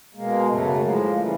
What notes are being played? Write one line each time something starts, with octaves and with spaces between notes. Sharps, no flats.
B2 G#3 A#3
F#2 C#3 F#3 A3
A2 F3 G#3 A#3
A#3
C#3 E3 G3 A3